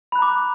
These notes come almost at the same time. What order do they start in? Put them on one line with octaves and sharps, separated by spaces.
B5 F#6 A#5 D6